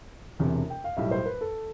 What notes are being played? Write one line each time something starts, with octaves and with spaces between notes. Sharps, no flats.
E1 E2 C3
G5
F5
B1 A2 G3 E5
C5
B4
A4